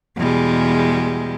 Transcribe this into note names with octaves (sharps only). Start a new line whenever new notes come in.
E2 B2 G3 G#3